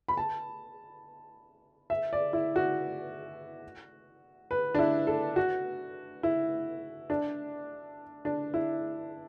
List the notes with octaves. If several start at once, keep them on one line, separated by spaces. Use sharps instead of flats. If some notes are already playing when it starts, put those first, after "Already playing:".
B5
A5
E5
D5
E4
F#4
B4
D4
E4
A4
F#4
E4
D4
D4
E4